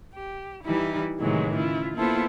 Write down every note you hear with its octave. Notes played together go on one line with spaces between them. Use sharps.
G4
E3 G3 D#4 E4
A2 C3 D#3 E3 F#3 G#3
C#3 E4 F4
A#3 B3 E4 F4 A4 C5